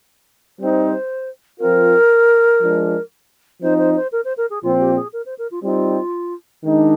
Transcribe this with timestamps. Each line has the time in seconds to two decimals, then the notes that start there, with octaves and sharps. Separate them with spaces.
0.58 G3 C4 D#4 C5
1.59 F3 C4 F4 A#4
2.60 F3 G#3 D4
3.61 F3 C4 D#4 C5
3.78 C5
3.95 C5
4.12 A#4
4.24 C5
4.37 A#4
4.50 G#4
4.62 A#2 F3 C4 F4
4.79 G4
4.96 G#4
5.13 A#4
5.25 C5
5.38 A#4
5.51 F4
5.63 G3 C4 D#4 F4
6.64 D#3 G#3 D4 D#4